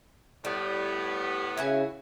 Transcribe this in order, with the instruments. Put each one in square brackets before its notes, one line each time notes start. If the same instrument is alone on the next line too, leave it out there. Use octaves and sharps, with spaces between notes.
[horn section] A2 B3 [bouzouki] G3
[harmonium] C#3 [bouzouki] E4 F#4 G#5